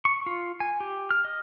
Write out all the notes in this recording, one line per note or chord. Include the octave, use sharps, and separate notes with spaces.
C#6
F4
G#5
G4
F6
D#5